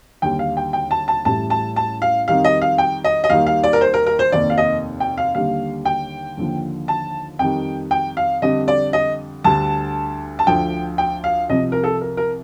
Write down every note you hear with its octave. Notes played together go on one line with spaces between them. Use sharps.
D#2 D3 G3 G5
F5
G5
G5
A5
A5
A1 A2 G3 A5
A5
A5
F5
F2 D#3 G3 F5
D#5
F5
G5
D#5
D#5
D#2 D#3 G3 F5
F5
D5
A#4
C5
A#4
A#4
C5
F1 D#2 D#3 D5
F5
D#5
G5
F5
D#2 D3 G3 F5
G5
D#2 D3 F3
A5
F2 D#3 G3 G5
G5
F5
F2 D3 G3 D#5
D5
D#5
D2 D3 G3 A5
A5
D2 D3 F3 G5
G5
F5
C2 C3 F3 D#5
A#4
A4
A#4
A#4